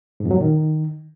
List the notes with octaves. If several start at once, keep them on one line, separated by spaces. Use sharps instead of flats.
G#2
F2
F#3
A#2
D#3